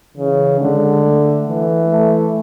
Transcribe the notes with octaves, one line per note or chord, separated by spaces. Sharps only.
C#3 E3
D3 G#3
A3
E3
A3